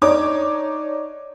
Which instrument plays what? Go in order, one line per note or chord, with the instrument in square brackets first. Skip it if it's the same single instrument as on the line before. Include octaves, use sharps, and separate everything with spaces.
[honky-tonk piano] D4 D#4 C#5 D6